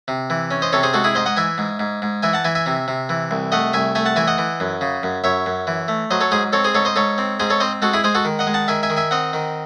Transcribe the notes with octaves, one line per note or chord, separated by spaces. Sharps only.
C3
E3
C#4
C5 D#5
C3 A4 C#5
G#4 C5
G#3 F#4 A4
E4 G#4
G#2 C5 D#5
D#5 F#5
E3 E5 G#5
G#2
G#2
G#2
E3 E5 G#5
F#5 A5
E3 E5 G#5
E5 G#5
C3
C3
E3
C2
A3 D#5 F#5
C2 E5 G#5
A3 E5 G#5
F#5 A5
E3 E5 G#5
D#5 F#5
E3
F#2
C#3
F#2
F#2 C#5 E5
F#2
E3
A3
F#3 C5 D#5
A4 C#5
G#2 G#4 C5
C4 A4 C#5
G#4 C5
G#2 A4 C#5
C5 D#5
G#2 A4 C#5
C4
G#2 G#4 C5
A4 C#5
C4 C5 D#5
G#3 F#4 A4
E4 G#4
G#3 G#4 C5
F#4 A4
D#3
D#5 F#5
G#3
F#5 A5
D#3 E5 G#5
E5 G#5
D#3
E5 G#5
C4 D#5 F#5
D#3